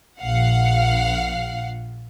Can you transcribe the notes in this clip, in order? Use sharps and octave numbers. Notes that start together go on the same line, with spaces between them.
A#1 F5 F#5